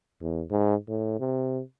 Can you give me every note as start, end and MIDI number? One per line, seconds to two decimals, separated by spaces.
0.22 0.43 40
0.50 0.75 44
0.89 1.18 45
1.20 1.61 48